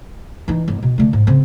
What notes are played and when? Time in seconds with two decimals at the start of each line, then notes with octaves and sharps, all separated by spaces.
0.48 E3 D#4
0.68 G1 E4
0.83 B2
0.98 D3 A3
1.13 G#2
1.27 C#3 C4